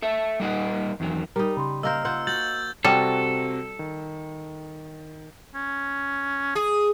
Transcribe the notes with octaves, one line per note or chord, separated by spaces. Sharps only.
A4 E5
G3 A#3 D#4 D#5 F#5
E2 D#3 F#3
G3 D#4 A#4
C#3 B5 C6
A#3 A#4 C5 D#5 F5 E6 F6
F4 C5 F#5
F#4 G6 A6 F#7
C3 G3 C4 F#4 A4
D#3
C#4
G#4 D#6